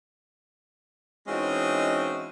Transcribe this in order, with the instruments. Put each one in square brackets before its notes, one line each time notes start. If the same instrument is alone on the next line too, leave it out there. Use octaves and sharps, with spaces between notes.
[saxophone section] E3 G#3 C4 C#4 D#4 F#4